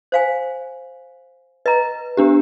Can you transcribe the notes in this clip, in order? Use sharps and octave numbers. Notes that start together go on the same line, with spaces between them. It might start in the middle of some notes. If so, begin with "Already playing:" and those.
C5 F5 G#5
B4 D#5 A#5
B3 D4 G4